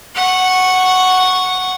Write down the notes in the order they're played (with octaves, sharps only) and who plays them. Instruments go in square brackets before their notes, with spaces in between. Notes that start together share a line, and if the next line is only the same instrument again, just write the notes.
[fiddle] F#5 C#6